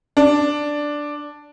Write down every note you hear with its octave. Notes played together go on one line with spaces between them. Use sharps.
D4